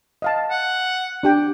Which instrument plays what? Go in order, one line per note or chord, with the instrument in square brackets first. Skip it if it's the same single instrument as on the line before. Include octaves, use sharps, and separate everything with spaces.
[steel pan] D#5 F5 A5
[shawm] F#5
[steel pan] D4 G4 G5